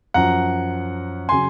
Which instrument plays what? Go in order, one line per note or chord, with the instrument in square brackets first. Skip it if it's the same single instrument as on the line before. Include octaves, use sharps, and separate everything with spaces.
[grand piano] F#2 F3 F#5 A#5
C#3 F#3 G#5 C6